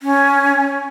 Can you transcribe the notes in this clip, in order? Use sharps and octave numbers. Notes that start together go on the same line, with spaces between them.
C#4